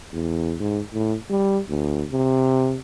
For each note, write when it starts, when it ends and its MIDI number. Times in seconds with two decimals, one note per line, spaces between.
0.13 0.55 40
0.60 0.81 44
0.93 1.15 45
1.30 1.60 55
1.69 2.04 38
2.12 2.78 48